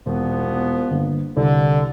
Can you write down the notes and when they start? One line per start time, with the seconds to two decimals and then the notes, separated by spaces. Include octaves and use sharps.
0.06 E1 C2 F3 B3
0.90 G1 A#3
1.37 C2 D3